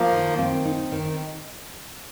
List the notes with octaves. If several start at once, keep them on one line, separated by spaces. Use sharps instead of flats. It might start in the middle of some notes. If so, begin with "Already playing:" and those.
Already playing: F3 A#3
D#3
C4
D#4
D#3